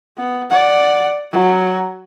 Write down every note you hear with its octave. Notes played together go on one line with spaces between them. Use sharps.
B3
D5 F#5
F#3